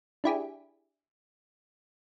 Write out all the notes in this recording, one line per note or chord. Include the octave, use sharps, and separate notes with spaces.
D4 E4 G4 G#4